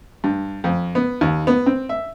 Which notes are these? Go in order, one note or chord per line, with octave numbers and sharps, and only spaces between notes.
G2
F2
B3
D#2
B3
C4
E5